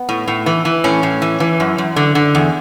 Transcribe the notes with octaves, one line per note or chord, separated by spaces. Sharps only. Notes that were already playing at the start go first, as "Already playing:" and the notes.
Already playing: B3
A2
A2
E3
E3
A2 C#4
A2
E3
E3
F#2
F#2
D3
D3
E2